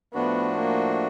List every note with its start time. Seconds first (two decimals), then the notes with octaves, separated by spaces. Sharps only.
0.14 A2 F3 A3 B3 D4 F#4
0.57 A#3